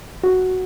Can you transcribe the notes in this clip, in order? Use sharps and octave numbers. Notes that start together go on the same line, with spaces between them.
F#4